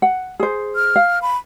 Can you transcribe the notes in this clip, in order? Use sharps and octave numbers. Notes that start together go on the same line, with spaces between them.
F#5
G#4 C5
F6
F5
B5